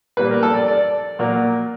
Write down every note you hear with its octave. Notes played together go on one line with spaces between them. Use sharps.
A#2 G3 A#3 B4
A#4
A4
D5
D5
A#2 F#3 A#3